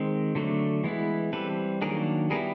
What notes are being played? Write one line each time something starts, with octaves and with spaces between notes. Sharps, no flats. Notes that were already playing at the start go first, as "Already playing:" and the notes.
Already playing: D#3 G#3 C4
D3 F#3 A3 D4
E3 G#3 B3 E4
E3 G3 C4 A4 B4
D#3 F#3 A#3 D4 G#4 A#4
G3 B3 E4 G#4 A#4